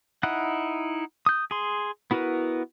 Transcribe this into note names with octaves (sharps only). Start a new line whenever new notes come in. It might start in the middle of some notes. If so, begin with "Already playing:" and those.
D#4 E4 F#5 F#6
D#6 G6
G#4 C6
B3 E4 F#4 A#4 B4